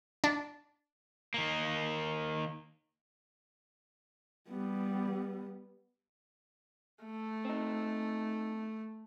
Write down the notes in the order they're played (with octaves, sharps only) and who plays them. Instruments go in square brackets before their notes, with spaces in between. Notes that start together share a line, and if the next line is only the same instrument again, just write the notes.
[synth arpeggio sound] D4
[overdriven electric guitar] D#3 A#3
[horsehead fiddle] G3 B3
[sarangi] A3
[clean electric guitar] C4 D#4